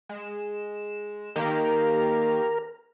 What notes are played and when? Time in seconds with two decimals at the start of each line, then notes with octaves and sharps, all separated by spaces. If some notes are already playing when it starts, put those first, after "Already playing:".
0.09 G#3 E7
1.36 D#3 A#3 G4 A#4